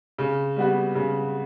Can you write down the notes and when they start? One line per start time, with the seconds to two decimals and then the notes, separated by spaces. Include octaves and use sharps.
0.19 C#3
0.57 G3 B3 F#4
0.95 C#3